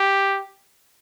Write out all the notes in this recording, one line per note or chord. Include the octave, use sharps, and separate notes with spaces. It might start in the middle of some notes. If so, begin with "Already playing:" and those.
Already playing: G4